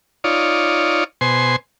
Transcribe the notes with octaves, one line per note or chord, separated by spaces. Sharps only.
D#4 F4 C#5 D5
B2 C5 G#5 C6